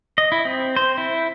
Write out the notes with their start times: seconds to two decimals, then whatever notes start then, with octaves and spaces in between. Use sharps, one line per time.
0.18 D#5
0.32 E4
0.45 C4
0.76 C5
0.98 E4